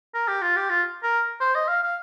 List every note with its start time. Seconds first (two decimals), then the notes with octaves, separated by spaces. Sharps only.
0.14 A#4
0.28 G4
0.42 F4
0.56 G4
0.69 F4
1.03 A#4
1.41 C5
1.55 D#5
1.68 F5
1.83 F5